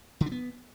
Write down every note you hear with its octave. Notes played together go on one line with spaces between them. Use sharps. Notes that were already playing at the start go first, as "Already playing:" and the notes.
D3
D4
B3